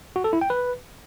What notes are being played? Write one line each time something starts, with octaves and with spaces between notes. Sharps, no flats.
F#4
A4
E4
G5
B4